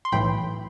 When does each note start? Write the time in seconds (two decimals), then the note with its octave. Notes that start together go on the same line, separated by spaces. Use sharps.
0.05 C6
0.12 B1 A2 E3 G5 B5